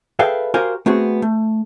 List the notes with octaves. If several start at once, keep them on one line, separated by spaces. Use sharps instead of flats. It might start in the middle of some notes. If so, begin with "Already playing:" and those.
G#4 A4 B4 E5 F5 G5
F#4 G4 A#4 C5 F5 G#5
A3 B3 C4 F#4 G#4
A3